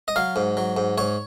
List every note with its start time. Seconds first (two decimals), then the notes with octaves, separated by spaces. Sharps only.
0.08 D#5
0.16 F#3 F5
0.36 G#2
0.57 F#3
0.77 G#2
0.98 G#2 C#5